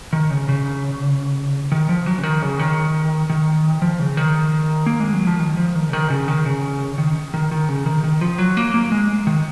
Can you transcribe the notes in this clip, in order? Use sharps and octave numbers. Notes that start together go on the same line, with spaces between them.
D#3
C#3
C#3
D#3
F3
F#3
C#3
D#3
C#3
D#3
D#3
F3
C#3
D#3
A#3
G#3
F#3
F3
D#3
F3
D#3
C#3
D#3
C#3
D#3
C#3
D#3
D#3
D#3
C#3
D#3
D#3
F3
F#3
A#3
A#3
G#3
D#3